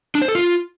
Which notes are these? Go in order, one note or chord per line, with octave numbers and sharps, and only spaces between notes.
D4
C5
A4
F4